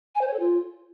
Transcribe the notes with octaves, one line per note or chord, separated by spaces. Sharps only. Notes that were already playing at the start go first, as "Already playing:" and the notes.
G#5
C5
C#5
A4
F4